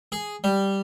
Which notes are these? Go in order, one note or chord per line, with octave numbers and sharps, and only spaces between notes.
G#4
G3